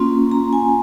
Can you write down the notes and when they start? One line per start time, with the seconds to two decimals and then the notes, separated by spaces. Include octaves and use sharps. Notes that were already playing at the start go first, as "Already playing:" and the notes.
Already playing: A#3 C#4 F4 C6
0.31 A#5
0.53 G#5